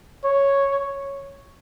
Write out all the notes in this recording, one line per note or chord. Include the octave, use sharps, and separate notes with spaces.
C#5